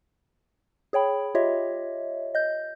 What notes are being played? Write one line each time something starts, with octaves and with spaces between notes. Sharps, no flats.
G#4 C#5 G5 B5
F4 G4 C#5 D#5 E5
D#5 G6